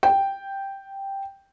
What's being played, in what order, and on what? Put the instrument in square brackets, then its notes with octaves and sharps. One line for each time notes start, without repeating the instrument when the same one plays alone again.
[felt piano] G5